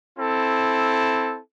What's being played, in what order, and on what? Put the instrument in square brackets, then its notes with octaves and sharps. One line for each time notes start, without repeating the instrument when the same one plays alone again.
[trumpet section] C4 E4 A4